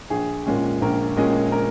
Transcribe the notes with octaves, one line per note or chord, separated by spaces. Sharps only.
A#1 G#4
A#2 G#3 C#4
A#1 A#4
A#2 G#3 C#4 D#5
A#4